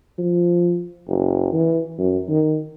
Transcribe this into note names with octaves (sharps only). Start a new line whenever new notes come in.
F3
F#1
E3
F#2
D#3